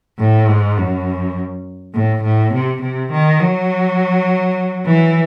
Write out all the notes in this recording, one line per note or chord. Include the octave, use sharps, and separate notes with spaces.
A2
G#2
F#2
A2
A2
C3
C3
D#3
F#3
E3